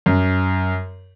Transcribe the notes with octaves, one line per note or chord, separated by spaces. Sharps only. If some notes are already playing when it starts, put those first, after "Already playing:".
F#2